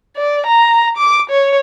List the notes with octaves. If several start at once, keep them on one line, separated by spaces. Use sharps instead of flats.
D5
A#5
D6
C#5